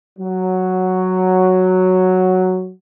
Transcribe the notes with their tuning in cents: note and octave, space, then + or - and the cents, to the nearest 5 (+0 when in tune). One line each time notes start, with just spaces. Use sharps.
F#3 +0